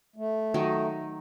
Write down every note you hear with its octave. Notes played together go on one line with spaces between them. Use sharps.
A3
D#3 F#3 D#4